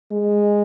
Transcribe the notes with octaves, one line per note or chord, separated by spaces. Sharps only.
G#3